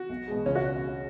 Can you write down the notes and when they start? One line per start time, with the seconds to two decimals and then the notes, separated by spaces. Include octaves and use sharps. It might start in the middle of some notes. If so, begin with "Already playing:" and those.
Already playing: F#4
0.09 B1
0.28 B2 G#3
0.46 C#2 C#4
0.55 F#4